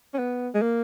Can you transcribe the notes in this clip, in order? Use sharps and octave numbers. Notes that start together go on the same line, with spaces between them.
C#4
B3
G#3
A#3